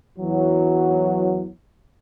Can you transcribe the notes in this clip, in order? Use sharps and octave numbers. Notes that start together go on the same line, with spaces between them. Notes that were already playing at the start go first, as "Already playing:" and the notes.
E2 E3 F#3